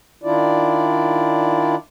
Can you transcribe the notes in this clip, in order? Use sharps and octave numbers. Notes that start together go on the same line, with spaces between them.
D#3 D4 E4 F4 D5